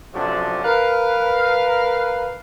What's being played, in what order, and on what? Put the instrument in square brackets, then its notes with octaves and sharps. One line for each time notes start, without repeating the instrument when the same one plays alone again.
[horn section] C3 F3 F#3 A3 C#4 D4
A#4 B4 F5